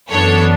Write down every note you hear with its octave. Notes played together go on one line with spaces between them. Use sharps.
F#2 E3 B3 D4 A4 C#5